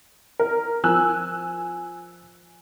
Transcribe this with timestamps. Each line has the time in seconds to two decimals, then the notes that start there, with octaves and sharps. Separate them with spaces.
0.39 A#4
0.84 F3 G#5 E6 F#6